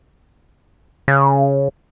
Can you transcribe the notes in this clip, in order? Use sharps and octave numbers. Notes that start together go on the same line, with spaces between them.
C#3